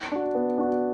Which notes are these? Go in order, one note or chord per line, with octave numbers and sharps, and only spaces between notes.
D4 F#4
B3
D4 F#4